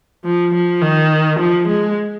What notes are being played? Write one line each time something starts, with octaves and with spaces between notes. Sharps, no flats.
F3
F3
D#3
F3
G#3